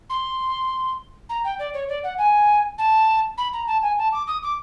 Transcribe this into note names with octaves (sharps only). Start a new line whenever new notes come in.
C6
A#5
G5
D5
C#5
D5
F#5
G#5
A5
B5
A#5
A5
G#5
A5
D6
D#6
D6